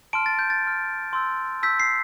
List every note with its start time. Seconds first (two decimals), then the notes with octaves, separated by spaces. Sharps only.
0.13 A5 C6 F6 D7
0.26 A6
0.39 G6
0.50 A6
0.64 C6 F6
1.13 C6 E6 G6
1.62 A5 E6 G6 B6
1.80 C7